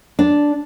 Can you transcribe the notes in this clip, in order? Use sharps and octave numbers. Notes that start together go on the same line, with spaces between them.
D4